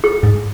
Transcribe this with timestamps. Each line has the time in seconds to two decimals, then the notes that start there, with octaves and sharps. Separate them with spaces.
0.04 G#4
0.23 G#2